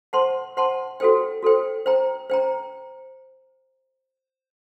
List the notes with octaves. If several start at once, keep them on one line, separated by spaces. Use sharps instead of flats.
C5 F#5 A5 C6
C5 F#5 A5 C6
F#4 A4 C5 G5
F#4 A4 C5 G5
C5 G5 A#5
C5 G5 A#5